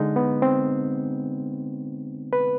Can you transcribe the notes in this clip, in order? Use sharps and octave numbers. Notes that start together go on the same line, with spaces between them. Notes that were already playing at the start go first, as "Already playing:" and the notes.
Already playing: D3 G#3 D#4
B3
C4
B4